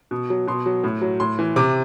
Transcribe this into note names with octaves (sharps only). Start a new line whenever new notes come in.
B2
F#3
B2 C6
F#3
A2
F#3
A2 C6
E3
C3 D6